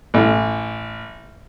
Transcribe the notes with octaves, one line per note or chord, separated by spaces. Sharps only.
A1